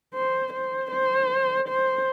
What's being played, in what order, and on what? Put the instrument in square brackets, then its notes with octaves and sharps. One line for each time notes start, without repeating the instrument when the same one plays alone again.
[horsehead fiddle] C5
C5
C5
C5